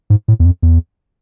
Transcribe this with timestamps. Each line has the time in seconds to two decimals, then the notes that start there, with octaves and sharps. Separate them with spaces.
0.10 G#2
0.28 A2
0.40 E2
0.45 F2
0.62 E2